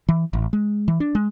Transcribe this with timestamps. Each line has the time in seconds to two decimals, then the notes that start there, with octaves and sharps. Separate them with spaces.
0.09 E3
0.33 A1
0.53 G#3
0.88 E3
1.00 D4
1.15 G#3